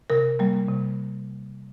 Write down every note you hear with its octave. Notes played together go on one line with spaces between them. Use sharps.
C3 A#4
G3 A#3
C3